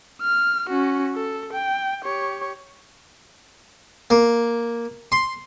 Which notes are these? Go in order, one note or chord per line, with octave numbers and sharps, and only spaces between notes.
F6
C#4 F#4
A4
G5
G4 C#5
A#3
C6